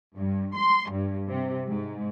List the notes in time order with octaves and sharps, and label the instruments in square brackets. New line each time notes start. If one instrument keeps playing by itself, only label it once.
[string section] G2
C6
G2
C3
G#2